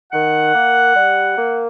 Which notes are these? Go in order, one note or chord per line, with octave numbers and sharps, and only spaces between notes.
D#3 F#5
A#3
G3
A#3